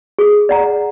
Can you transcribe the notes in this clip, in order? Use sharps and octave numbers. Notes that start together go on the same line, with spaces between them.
G#4
D5 F#5 A#5